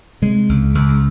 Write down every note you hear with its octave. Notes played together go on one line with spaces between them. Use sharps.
C3 G#3
C#2
C#2